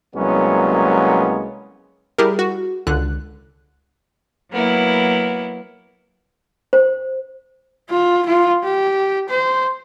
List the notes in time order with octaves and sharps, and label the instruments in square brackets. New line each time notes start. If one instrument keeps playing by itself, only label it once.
[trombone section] C2 F#3 G#3 A#3 B3 C#4
[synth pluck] G3 E4 G4 G#4 A#4
F#4
C#2 D3 F#6
[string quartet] F#3 A#3 B3 E4
[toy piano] C5
[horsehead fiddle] F4
F4
G4
C5